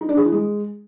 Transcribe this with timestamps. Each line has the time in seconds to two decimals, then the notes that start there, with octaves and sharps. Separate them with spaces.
0.01 D#4
0.09 D4
0.17 G#4
0.24 E3
0.32 G#3